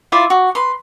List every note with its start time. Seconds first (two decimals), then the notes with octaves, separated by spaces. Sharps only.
0.12 E4 F4 D5 F5
0.30 F#4
0.55 B4 B5 C6